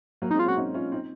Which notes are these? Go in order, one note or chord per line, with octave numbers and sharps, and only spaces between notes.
F#3 A#3
D#4
G#3 C4
F4
A#3 C#4
F#4
C4 D#4
C#4 F4
C4 D#4